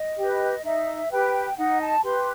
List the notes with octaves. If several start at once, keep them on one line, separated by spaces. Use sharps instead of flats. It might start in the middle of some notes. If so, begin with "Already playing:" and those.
Already playing: D#5
G4 B4
D#4 E5
G4 B4 G5
D#4 F#5
A5
G4 B4 C6